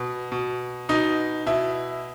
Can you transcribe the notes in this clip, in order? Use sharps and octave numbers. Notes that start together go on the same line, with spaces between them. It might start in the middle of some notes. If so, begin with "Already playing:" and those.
Already playing: B2
B2
B2 D#4
B2 E4